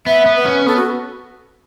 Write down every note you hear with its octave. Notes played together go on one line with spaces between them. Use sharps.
B3 E5
B3
B4
C#4
B3 A4
F#4